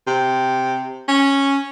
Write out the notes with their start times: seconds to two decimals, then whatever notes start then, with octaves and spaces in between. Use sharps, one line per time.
0.07 C3
1.08 C#4